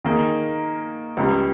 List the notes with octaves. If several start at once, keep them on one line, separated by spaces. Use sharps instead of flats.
D#3 A#3 D#4 G#4
C#2 C#3 G3